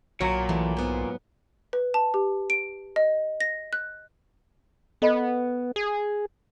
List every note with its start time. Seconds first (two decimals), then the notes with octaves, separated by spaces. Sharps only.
0.21 B1 A#2 F#3 C#5
0.49 E3 A3
0.77 G#2 B3
1.73 B4
1.94 A5
2.14 G4
2.50 D7
2.96 D#5
3.41 A#6
3.73 F#6
5.02 B3 A4 D#5 B5
5.76 G#4